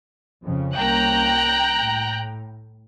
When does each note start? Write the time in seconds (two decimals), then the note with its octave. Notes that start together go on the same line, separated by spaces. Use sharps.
0.42 F2 C#3
0.76 C2 A#3 C#4 G5 A#5 F#6 G6
1.76 A2